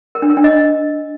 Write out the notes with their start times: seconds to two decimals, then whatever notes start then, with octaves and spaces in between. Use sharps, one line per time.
0.15 A#4
0.22 D4
0.30 A#4
0.37 D4
0.44 D#5